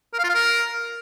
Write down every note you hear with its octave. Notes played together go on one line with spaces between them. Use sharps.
A#4
F5
F4
F5
A#4